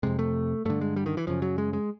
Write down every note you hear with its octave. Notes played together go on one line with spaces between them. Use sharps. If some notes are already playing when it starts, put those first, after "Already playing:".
F2 C3 G#3
A3
G2 D3 A3
G#3
G3
D#3
E3
F#2 C#3 F3
F#3
G#3
G#3